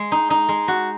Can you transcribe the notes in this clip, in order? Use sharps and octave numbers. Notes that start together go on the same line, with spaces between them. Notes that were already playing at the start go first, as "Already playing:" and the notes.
Already playing: G#3
D#4
D#4
G#3
F#4